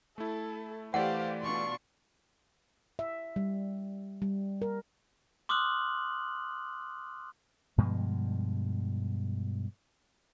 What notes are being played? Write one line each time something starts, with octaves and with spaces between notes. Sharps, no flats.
A3 E4 A4
E3 A3 G4 C5 D5 F5 F#5
B2 D4 F4 C6 C#6
E5
G3
G3
A#4
C6 D6 D#6 F6 F#6 F#7
G2 B2 F3 G#3